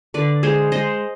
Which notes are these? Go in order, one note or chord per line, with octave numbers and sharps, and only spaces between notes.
D3 B4 D5
G#3 G#4 C5
G#3 C5 D#5